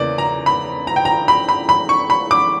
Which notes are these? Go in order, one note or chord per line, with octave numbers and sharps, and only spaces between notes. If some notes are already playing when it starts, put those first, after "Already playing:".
Already playing: E2 C#3 E3 A#3 D5
A#5
B5
A#5
G5
A#5
B5
B5
B5
C#6
B5
D6